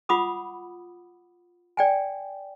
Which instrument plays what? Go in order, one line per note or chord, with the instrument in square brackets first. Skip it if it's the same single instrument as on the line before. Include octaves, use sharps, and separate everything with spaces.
[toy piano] F4 F#5 B5 D6 D#6
D5 G5 G#5